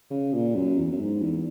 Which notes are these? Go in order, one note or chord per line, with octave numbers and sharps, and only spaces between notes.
C#3
A#2
F#2
E2
F#2
G#2
E2